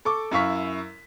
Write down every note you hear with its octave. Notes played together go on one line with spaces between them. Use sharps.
A4 C#6 D6
F#2 E4 F5 C#6 B6